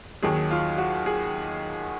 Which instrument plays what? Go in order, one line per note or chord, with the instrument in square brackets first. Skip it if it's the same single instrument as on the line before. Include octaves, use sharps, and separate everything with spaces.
[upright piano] D#2 D#3 F#3 G#4
F4
F#4
G#4